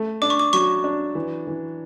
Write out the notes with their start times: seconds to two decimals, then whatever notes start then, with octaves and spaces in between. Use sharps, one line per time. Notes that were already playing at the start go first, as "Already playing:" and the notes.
Already playing: A3
0.22 D4 D6
0.30 C#6
0.39 D6
0.53 F#3 C#6
0.84 D4
1.15 E3
1.47 E3